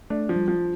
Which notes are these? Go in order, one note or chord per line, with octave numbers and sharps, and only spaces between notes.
A3 D4
F3
G3
F3